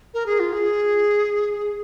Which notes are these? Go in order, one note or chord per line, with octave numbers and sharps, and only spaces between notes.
A#4
G#4
F4
G#4